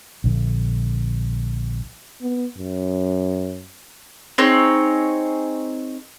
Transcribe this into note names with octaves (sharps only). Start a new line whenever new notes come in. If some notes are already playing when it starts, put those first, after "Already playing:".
A#1 D3
B3
F#2
C4 D#4 G#4 C#5